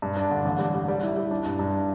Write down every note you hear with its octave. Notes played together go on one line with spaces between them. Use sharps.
G2
D4
D3
A1
G3
G3
G3
E4
G3
D4
G2
G2